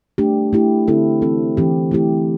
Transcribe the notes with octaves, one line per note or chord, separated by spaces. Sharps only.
A3 D4 G4
A3 E4 G4
D3 C4 E4 A4
E3 C4 A4
E3 C4 G4
A3 E4 G4